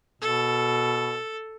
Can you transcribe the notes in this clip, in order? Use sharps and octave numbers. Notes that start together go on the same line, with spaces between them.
B2 A4